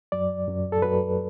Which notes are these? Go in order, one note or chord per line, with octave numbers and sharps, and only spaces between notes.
F#2 F#3 D5
F#2 F#3
A4
F#2 F#3 B4